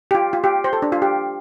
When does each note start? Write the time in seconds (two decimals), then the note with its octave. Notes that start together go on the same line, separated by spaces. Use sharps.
0.11 G4
0.15 F4
0.33 F4
0.44 G4
0.64 C5
0.73 A4
0.82 D4
0.92 F4
1.02 G4